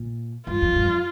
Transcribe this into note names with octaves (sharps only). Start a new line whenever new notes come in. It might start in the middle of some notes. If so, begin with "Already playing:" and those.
Already playing: A#2
G2 F4
F2
G2
F2